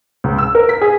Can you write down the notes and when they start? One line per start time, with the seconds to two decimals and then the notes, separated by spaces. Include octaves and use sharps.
0.24 C#2
0.38 E6
0.55 A#4
0.69 B6
0.82 G#4